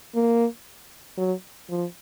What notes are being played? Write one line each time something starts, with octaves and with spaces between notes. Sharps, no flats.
A#3
F#3
F3